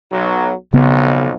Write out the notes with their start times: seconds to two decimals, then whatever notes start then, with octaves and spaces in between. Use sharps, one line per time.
0.12 B1 F#3
0.73 B1 F2 C#3 B3